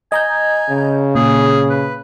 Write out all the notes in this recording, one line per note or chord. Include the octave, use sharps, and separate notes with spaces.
D#5 G#5 A#5 G6
C#3
A#2 G#4
B4